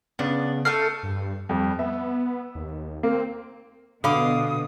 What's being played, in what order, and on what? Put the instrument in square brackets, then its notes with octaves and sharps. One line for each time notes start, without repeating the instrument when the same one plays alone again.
[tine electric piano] C#3 B3 [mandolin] D4
[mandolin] A3 A4 F6 [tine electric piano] C7
[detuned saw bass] G2
[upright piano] F2 [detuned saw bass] G3
[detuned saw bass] B3 [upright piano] E5
[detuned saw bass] D#2
[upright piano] A#3 A#4 [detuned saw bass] C4
[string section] B2 [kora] D3 [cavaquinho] F5 B5 D6 [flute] D#6